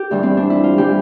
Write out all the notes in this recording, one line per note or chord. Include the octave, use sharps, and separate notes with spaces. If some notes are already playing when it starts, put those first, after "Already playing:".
Already playing: G4
G2 E3 G3
C4
D4
E4
F4
E3 G3 G4